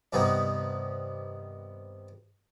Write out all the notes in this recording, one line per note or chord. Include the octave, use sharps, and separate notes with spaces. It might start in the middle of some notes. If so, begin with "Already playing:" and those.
G2 C3 D#3 G3 B3 D#4